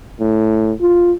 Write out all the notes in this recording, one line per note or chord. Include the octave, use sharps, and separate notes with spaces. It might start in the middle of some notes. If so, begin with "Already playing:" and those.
A2
F4